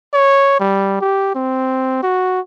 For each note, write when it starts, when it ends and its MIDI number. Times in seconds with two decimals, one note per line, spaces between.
0.14 0.59 73
0.60 0.98 55
1.01 1.31 67
1.35 2.02 60
2.03 2.40 66